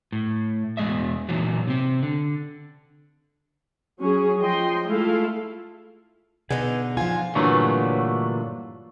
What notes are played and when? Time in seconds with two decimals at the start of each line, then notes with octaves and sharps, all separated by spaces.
0.12 A2
0.77 E2 B2 G#3 D#5 E5
1.29 A#2 D#3 E3 F#3
1.68 C3 C4
2.03 D3
3.98 F#3 C#4 G#4
4.38 F3 D#5 G5 C6
4.87 G#3 A3 E4 F4 A4 F5
6.51 B2 D3 D#4 G#4 B4
6.97 F3 F4 G#5
7.35 G2 A#2 D3 E3 F#3 A3